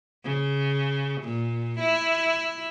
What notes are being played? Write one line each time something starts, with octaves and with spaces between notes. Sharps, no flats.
C#3
A#2
E4